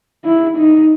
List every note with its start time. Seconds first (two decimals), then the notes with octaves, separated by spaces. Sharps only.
0.25 E4
0.57 D#4